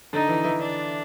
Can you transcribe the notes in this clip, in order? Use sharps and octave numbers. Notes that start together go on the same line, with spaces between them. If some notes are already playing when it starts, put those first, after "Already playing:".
D3 D4 D#4
E3 E4
E3 E4
D4